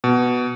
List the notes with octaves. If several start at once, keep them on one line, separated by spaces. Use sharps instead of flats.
B2